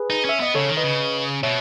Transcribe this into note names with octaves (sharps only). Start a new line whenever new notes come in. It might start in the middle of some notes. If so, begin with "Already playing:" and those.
Already playing: G#4 B4
D#4
C#4 E5
B3 D#5
C#3 A4 C#5
D#3
B4 D#5
C#3
B2 C#5 E5